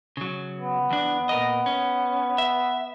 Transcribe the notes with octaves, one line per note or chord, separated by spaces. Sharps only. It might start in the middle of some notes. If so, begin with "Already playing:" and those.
C#3 F#3
B3
E2 D4
A#2 A#4 D#5
C#4
E5